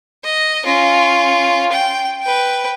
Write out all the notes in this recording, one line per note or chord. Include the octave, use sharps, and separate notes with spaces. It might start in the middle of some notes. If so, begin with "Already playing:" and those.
D#5
C#4 F4
G5
B4 G5